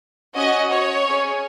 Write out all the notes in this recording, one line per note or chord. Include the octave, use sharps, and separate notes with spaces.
C#4 F#4 D#5
C#5
C#4 G#4